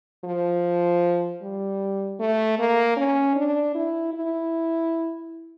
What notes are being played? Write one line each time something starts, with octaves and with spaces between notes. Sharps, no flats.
F3
G3
A3
A#3
C#4
D4
E4
E4